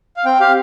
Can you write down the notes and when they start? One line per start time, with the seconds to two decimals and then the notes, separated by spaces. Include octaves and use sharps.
0.17 F5
0.25 C4 G5
0.40 G4 F5